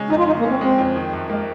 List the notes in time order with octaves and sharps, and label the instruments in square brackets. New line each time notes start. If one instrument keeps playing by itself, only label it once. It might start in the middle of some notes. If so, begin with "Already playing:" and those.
Already playing: [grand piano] C#3 G#3 C#4
[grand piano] F2 [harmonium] D#4
[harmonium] F4
[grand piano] C#3 [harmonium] D#4
[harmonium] A#3
[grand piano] C#4
[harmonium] C4
[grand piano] G#3 [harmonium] C4
[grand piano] F2
D#3
F#2
[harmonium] G#3 [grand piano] A#3